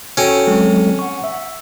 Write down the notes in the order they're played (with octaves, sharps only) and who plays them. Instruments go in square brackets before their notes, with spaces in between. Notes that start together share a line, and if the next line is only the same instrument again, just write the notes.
[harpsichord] C#4 [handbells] F#4 A4 G5
[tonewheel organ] F#3 G#3 A4 [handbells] C4
[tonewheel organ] F#5 [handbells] C#6
[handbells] E5